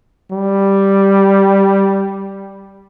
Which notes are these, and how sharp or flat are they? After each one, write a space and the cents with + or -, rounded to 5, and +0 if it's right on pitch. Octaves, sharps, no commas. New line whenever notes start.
G3 +0